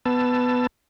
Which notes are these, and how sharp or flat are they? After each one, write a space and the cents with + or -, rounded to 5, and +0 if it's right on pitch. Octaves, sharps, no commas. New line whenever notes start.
B3 +10 A5 +0 E6 +25